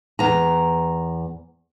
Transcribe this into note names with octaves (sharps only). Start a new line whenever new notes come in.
E2 A#5